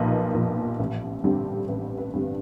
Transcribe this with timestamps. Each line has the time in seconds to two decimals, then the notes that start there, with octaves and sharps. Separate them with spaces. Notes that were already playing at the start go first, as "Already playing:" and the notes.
Already playing: B1 A#2 F3 A#4 B4 D#5
0.35 A#2 F3
0.79 A1
1.24 G2 D3 G3 C4
1.69 A1 B4
1.98 B4
2.13 G2 D3 G3 C4